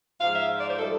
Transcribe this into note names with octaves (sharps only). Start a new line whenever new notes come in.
G#2 F3 F5
E5
D5
C5
D#3 G3 A4